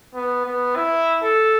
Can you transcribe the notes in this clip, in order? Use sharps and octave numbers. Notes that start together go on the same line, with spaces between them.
B3
B3
E4
A4